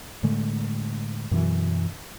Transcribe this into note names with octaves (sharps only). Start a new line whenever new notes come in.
A2 D3 G#3 A3
F#2 B2 E3 F#3